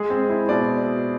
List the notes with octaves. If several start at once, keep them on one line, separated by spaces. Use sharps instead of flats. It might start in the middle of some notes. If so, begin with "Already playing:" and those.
Already playing: G#3 G#4
C4
E4
B2 D5